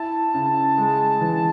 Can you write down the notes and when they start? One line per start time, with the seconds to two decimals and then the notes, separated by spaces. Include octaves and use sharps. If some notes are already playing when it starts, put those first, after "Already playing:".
Already playing: E4 A5
0.34 C#3
0.78 G#3
1.21 E3